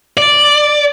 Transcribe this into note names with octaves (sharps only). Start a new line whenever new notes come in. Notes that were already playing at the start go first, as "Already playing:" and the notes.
D5